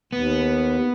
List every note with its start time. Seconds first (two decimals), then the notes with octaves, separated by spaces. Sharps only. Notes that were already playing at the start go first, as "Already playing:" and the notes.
0.13 D#2 B3